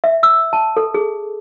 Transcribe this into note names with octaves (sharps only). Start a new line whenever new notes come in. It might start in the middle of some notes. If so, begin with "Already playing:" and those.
E5
E6
A5
A4
G#4